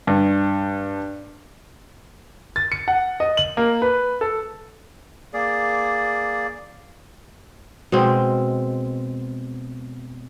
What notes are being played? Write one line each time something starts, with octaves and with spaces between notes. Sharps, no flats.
G2
A6
C#7
F#5
D#5
F#7
A#3
B4
A4
A#3 G#4 D5
B2 G#3 C4